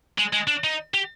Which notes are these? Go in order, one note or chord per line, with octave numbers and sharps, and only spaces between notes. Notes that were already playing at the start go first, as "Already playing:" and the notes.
G#3
G#3
D4
D#4
G4